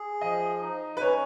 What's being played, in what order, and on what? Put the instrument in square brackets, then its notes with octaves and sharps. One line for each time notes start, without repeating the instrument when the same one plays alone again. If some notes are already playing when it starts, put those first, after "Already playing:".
Already playing: [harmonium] G#4
[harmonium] F3 [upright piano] D#5
[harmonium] D#4
[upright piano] B4
[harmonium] C#4 [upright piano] C#5